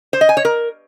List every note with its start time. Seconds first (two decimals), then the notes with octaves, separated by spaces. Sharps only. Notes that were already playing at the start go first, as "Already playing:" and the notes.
0.13 C5
0.21 D#5
0.29 G#5
0.37 C#5
0.45 A#4